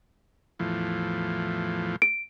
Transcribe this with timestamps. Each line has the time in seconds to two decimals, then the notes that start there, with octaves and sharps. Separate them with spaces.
0.59 E2 A2 F3
2.02 D7